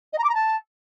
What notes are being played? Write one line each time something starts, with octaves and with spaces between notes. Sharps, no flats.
D#5
A#5
D6
A#5
A5